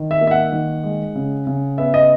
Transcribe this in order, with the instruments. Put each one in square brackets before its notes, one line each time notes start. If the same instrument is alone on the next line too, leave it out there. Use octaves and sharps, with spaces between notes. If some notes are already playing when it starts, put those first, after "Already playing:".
Already playing: [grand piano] D#3
E5
A#3
E5
F#5
D#3
G#3
C#3
C#3
B3 E5
D#5